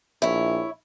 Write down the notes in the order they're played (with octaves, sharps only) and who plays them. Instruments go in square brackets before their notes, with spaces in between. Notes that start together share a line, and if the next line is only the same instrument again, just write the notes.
[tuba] A#1 [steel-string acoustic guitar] E4 C#5